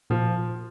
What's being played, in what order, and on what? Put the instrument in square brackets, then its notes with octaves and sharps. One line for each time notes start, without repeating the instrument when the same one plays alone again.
[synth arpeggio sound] A#2 [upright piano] F3